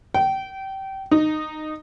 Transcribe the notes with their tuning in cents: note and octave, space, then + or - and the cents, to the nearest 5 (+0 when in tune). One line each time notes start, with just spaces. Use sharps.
G5 -25
D#4 -15